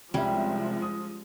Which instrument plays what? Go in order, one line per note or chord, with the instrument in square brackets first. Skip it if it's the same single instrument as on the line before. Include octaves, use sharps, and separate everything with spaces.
[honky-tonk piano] C2 E5 [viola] F3 G#3 [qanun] G3 C#4
[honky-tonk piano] D#6